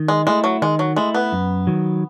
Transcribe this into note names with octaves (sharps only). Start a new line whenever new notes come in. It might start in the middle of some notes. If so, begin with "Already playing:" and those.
Already playing: D#3
G#3
G#3 A3 E4
F#3
D#3 G#3
F#3
G#3 A3 E4
B3
F#2
D#3 F#3